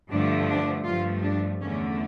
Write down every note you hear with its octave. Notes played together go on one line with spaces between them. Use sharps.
G2 D3 F3 A3 D4
D4
G2 F3 A3 F4
D4
E2 D3 A3 C#4